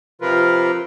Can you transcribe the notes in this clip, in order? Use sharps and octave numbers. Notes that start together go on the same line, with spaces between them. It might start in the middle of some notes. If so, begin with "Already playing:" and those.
C3 F3 F4 A#4 B4